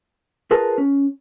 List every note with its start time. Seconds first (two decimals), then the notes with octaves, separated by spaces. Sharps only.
0.51 F4 G#4 A#4 B4 A5
0.78 C#4